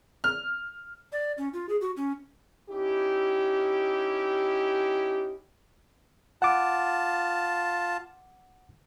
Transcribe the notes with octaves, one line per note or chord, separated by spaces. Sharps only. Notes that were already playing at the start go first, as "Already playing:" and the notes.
F6
D5
C#4
F4
G#4
F#4
C#4
C#4 D#4 E4 G4
F4 F#5 A5 D6